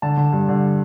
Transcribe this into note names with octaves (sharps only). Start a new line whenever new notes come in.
D3 A5
D3
G2
D3